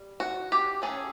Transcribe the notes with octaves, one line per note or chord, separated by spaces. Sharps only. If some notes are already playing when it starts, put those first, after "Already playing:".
Already playing: G3
F#4
G4
F#3 A3 C#4 G#4